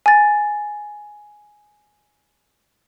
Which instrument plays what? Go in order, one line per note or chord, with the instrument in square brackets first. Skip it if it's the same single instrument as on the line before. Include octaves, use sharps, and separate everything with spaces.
[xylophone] G#5 A6